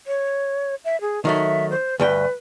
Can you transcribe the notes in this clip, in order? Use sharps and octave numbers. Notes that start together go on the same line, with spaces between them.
C#5
E5
G#4
D#3 F#3 A3 E5
C5
D2 G2 B4 G5